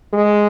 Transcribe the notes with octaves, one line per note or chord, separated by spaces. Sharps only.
G#3